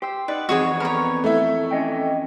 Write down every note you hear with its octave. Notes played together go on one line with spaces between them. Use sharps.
G4 C5 E6
D#4 B4 D5 F#5
F2 E3 F#4 G#4 C#5 D#6
B3 A4 A#4 C#5 B5
A3 E4
C#4 D#5 G5